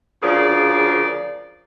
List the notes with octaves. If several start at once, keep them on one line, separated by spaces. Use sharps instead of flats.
D2 C#3 F3 G#4 A#4 D5